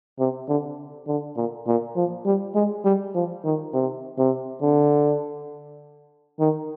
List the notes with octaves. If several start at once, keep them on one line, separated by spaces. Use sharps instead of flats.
C3
D3
D3
A#2
A#2
F3
G3
G#3
G3
F3
D#3
C3
C3
D3
D#3